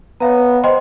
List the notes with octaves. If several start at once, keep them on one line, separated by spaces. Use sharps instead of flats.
B3 C#5 F5 A#5
C5 D#5 G5 C6